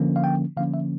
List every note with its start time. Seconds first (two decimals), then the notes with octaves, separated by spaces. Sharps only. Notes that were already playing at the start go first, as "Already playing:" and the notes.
Already playing: D3 F3 A#3 C#4
0.16 F5
0.24 G5
0.57 D3 F3 A#3 C#4 F5
0.74 E5